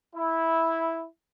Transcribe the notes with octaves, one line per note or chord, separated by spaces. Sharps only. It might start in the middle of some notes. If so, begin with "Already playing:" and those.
E4